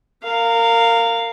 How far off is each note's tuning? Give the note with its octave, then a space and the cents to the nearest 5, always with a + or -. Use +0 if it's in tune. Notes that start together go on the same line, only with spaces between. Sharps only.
A#4 -25 F5 +0